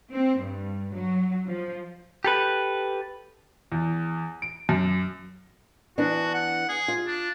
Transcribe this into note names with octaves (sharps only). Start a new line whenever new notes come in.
C4
G2
F#3
F3
G4 A4 B4
E2
D7
F#2
E3 B3 D4 F#4
F#5
G#4
F4
D4